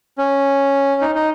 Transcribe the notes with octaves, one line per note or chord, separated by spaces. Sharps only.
C#4
D#4
D#4